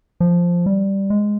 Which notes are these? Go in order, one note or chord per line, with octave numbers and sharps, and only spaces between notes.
F3
G3
G#3